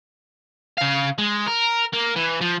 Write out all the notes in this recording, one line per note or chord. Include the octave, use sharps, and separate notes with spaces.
C#3 F5
G#3
A#4
A#3
E3
F3